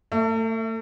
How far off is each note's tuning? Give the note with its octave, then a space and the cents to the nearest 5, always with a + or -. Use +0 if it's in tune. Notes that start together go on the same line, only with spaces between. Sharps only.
A3 +35 E5 +0